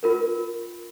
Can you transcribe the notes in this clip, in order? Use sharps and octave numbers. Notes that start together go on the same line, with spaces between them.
F4 A#4 B4